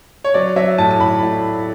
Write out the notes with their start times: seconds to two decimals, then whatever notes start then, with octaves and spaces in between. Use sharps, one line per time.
0.24 C#5
0.34 F#3 D5
0.56 F#3 E5
0.78 A2 A5
0.91 A5
1.00 A2 B5
1.23 A2